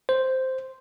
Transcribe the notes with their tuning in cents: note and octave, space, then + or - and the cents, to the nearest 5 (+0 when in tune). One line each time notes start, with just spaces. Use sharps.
C5 -5